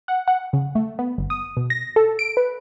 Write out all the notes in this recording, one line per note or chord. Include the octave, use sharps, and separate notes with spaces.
F#5
F#5
C#3
A3
B3
G1
D#6
B2
A#6
A4
D7
B4